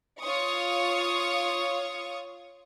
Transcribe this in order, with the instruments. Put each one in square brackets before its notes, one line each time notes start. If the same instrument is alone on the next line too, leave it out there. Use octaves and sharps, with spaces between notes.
[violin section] F4 C#5 C#6 D#6